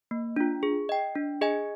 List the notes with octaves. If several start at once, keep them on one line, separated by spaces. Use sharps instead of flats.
A#3
D4 F4
G#4
D#5 G5
D4
G#4 D#5 G#5